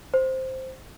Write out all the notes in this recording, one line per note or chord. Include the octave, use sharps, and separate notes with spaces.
C5